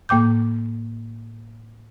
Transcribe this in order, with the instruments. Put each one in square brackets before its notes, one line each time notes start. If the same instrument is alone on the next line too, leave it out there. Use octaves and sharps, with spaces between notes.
[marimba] A2 A#3 G5 D6 G6